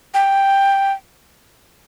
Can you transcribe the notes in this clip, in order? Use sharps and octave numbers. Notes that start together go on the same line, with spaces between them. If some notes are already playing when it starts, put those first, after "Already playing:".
G5